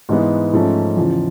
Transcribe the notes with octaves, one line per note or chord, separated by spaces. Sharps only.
G#2 E3 G#3 B3
G#2 F3 A3 C#4
E2 C#3 F3